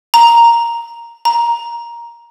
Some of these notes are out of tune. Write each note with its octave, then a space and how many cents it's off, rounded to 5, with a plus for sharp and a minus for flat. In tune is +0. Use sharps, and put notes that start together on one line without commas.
A#5 +0
A#5 +10